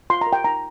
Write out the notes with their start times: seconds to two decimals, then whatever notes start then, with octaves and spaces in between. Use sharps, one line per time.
0.10 F4 C6
0.21 A#5
0.27 A#4
0.33 G5
0.44 D#4 A#5